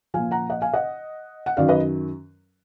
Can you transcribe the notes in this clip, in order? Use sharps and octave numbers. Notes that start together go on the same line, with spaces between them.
A#2 F3 F5 G#5
F#5 A#5
D#5 F#5
F5 G#5
D#5 F#5
F#5
F#2 D#3 F#3 D5 F5
B4 D#5